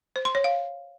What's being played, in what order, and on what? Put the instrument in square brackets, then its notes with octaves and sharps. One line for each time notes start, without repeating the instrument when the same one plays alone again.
[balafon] C5
C6
C#5
F5